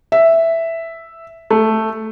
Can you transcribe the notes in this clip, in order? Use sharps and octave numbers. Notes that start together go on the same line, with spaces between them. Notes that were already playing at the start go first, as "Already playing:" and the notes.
E5
A3